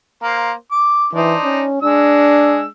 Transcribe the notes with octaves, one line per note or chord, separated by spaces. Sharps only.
A#3 C5
D6
E3 D4 D#4 C5
C#4
G#3 D4 E6